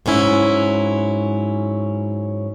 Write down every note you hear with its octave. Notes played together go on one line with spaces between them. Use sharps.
G#2 F#3 C#4 E4